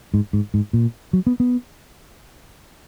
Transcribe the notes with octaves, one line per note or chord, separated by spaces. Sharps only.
G#2
G#2
G#2
A#2
F#3
B3
B3